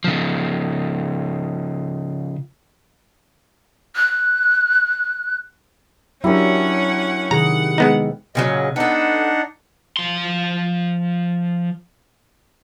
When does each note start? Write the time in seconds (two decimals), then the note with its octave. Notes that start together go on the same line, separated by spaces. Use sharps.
0.04 C#3 F3
3.96 F#6
6.24 F#3 C#4 D4 E4 G4 A#4 F#5
7.31 C3 D#3 G#4 F#5 A#5
7.78 G#3 B3 D#4
8.35 A#2 C#3 F#3 D#5
8.76 B3 D4 D#4 A4 F#5
9.97 F3 C6